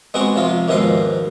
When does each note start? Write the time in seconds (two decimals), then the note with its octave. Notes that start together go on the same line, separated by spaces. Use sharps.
0.14 G#3 B3 C4 F#4 C#6 D6
0.36 C3 F3 F4
0.68 D#2 G#2 B2 F3 B4 C6